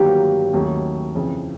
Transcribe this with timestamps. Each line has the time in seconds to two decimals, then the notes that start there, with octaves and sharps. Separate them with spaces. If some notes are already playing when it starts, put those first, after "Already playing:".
Already playing: G1 G2 D#3 F#3 A#3 G4
0.53 D#2 D#3 F#3 A3 C#4
1.15 F2 C#3 E3